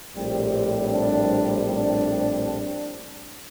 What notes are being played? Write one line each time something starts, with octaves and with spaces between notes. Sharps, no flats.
A#1 A2 G3 C4 G4
D4
D4